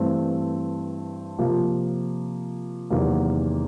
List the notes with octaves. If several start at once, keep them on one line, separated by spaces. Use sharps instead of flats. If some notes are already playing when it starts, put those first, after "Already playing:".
Already playing: G2 E3 A3 C4
C3 F3 A#3
E2 C3 D#3 F#3 A#3